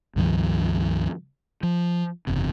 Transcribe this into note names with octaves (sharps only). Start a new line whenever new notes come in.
C#2 G2 D#3 F3
F3
F#1 E2 C3